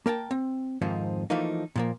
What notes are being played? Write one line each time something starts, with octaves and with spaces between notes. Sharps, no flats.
A#3 A#4 G5 A5
C4
F2 G#2 D#3 F3 C4 D#4
E3 F3 A3 A#3 D#4
A#2 F3 A#3